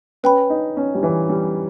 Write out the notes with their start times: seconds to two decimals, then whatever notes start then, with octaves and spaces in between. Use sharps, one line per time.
0.23 C#4 B4 G5 B5
0.50 D#4
0.77 C#4
0.95 G3
1.03 E3
1.29 G3